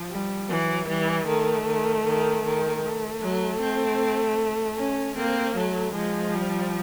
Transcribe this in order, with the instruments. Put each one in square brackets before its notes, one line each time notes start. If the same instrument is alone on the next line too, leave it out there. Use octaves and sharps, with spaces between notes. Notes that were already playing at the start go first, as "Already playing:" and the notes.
Already playing: [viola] F3
[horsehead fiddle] G3
[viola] E3 [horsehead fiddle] F#3
[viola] E3 [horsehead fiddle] G3
[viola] D#3 [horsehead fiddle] A3
[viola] D#3
D#3
D#3
[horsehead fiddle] A3
[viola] F#3
C4
C#4
[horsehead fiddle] A#3 [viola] C4
[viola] F#3 [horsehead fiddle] A3
[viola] F3 [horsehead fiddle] G#3
[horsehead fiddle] G3